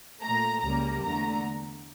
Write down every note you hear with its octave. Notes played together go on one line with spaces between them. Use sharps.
A#2 A3 A#5
C#2 C#3 G3 A#3 A#5
E2 D3 A3 A#5